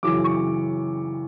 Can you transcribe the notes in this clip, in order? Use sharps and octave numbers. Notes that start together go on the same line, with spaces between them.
F#2 C#3 E3 D6
C#6